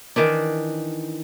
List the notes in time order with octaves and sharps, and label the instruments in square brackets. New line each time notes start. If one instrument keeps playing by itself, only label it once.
[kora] D#3 E3 D4